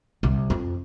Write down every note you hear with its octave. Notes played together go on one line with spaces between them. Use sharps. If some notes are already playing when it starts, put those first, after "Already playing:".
C2
F2